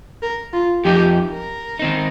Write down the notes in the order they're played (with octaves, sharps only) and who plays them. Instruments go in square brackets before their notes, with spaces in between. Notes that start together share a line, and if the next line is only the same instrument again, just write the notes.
[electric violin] A#4
F4
[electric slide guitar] F2 F3 D#4 [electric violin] G4
[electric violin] A#4
[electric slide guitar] D#3 C4 D#4